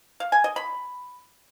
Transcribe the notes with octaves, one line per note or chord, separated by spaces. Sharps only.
F5
G#5
D#5
B5